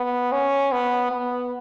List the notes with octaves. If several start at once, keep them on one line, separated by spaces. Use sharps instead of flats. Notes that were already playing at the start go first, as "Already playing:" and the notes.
Already playing: B3
C#4
B3
B3